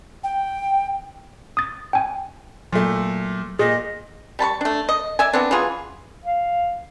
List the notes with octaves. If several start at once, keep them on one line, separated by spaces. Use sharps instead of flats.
G5
D#6 A6
G5 G#5
A#2 F#3 A3
A#2 G#4 D#5
G3 A5 B5 C#6
A3 D4
D#5
D5 E5 G#5
E3 B3 C4 D4
E3 F#3 F4 G#4
F5